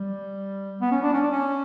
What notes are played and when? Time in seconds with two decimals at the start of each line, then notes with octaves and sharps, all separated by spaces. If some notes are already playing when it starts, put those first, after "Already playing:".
Already playing: G3
0.81 B3
0.91 C#4
1.02 D4
1.13 C#4
1.22 D4
1.32 C#4